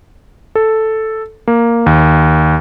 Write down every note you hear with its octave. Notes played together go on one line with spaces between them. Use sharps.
A4
A#3
D#2